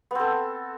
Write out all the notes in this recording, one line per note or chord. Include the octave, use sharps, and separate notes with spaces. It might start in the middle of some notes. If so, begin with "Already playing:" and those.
B3 C4 A4